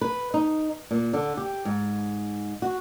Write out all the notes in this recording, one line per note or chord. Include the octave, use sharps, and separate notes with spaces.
B4
D#4
A#2
D3
G4
G#2
F#4